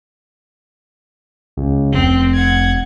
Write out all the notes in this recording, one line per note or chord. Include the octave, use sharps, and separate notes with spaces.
C#2
F1 C4
F#5 G#6